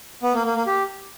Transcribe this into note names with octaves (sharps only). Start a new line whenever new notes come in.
B3
A#3
A#3
A#3
G4